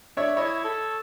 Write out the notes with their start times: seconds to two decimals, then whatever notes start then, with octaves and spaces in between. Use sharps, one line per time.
0.17 D4 C#5 E5
0.37 E4 C#5 D#5
0.65 A4